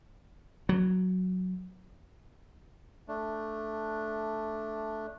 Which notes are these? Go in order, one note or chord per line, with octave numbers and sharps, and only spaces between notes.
F#3
A3 D4